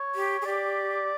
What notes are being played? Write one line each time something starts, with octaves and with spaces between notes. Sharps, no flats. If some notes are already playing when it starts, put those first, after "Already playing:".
Already playing: C#5
G4
G#4
G4 D5